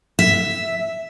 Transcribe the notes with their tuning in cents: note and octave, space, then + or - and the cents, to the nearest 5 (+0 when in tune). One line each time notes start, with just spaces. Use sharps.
E5 +0